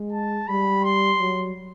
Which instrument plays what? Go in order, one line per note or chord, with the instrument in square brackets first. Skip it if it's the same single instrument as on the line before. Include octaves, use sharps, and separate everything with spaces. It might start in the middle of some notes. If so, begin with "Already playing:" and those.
Already playing: [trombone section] G#3
[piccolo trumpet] A5
[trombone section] G3 [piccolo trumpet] B5
[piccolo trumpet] C6
[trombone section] F#3